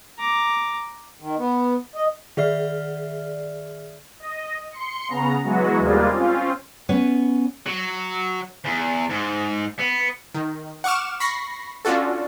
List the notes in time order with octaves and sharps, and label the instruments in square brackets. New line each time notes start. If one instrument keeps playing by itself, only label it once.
[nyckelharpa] A#5 D6
[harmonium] D#3
B3
D#5
[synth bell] D#3 G#4 D5 E5 F6 C7
[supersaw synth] D#5
C6 C#7
C#3 B3 A#5
E3 F#3 G#3 B3 F#4
D#2 C3 G3 G#3 A#3 F4
C4 C#4 F4
[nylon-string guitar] B3 C#4 B4 C#5
[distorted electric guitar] F#3
E2
G#2
B3
[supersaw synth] D#3
F#5 C#6 D6 F6 E7
B5 C#6 A#6 C7
C#4 D4 F4 F#4 A4